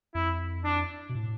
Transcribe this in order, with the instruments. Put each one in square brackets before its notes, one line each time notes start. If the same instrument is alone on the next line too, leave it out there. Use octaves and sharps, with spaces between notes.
[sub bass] F2 [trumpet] E4
[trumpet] D4
[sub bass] B2
A2